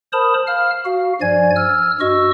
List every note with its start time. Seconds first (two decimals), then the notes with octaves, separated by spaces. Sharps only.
0.13 A#4 C5 A5 B5 D#6
0.47 F5 F6
0.85 F#4 F5
1.21 G2 F3 D5 G#5 G#6
1.56 E6 F6
2.00 G2 F#4 D#5 C#6 E6